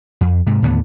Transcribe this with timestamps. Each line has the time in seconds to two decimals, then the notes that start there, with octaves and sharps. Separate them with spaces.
0.21 F2
0.47 G#2 C3
0.62 D#2 A2 D3 B3